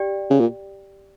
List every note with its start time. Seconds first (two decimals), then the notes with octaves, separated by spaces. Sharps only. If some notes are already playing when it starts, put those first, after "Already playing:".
Already playing: G4 D5 G5
0.30 C#3
0.40 A#2